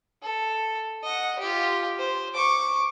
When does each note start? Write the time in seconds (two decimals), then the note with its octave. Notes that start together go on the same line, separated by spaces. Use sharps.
0.22 A4
1.03 D#5 F#5
1.39 F4 G4
1.99 C5
2.34 C#6 D6